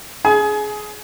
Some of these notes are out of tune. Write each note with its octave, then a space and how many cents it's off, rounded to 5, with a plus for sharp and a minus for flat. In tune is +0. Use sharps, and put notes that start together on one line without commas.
G#4 +15 G#5 +30